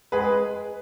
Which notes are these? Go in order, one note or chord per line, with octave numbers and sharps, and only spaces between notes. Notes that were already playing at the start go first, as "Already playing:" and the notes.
G#3 G#4 B4